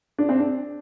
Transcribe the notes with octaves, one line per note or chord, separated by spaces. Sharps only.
D4
C4
D4